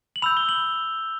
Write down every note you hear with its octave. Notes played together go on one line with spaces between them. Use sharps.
F#7
B5 E6 G6 F7
G7
F#7